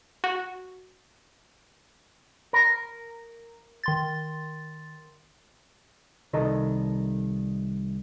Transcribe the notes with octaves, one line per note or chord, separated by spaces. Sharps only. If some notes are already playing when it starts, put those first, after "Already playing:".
F#4
A#4
D#3 C6 A6
C2 D#3 A4 A#4 D#5